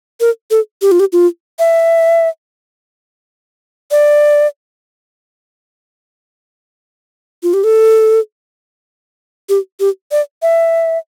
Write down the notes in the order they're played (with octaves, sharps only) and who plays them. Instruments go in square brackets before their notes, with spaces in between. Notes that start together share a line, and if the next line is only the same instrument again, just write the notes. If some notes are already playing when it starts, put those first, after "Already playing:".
[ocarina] A#4
A4
G4
F4
G4
F4
E5
D5
F4
G4
A4
G4
G4
D5
E5